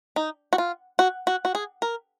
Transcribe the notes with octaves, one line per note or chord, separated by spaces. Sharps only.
D#4
F#4
F4
F#4
F#4
F#4
G#4
A#4